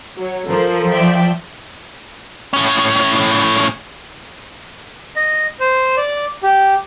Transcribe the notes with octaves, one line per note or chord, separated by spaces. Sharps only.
F#3 C#5
F3 A4 A#4 C5
D5 E5 G5
A2 C#4
D#5
C5
D5
G4